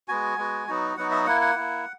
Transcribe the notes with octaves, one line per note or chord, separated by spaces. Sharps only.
G#3 B3 F#4 G#5
G#3 B3 F#4
F#3 B3 D#4 F#4
F#3 B3 D#4 F#4 F#5
E5
A#3 E4 F#5
F#5
A#3 E4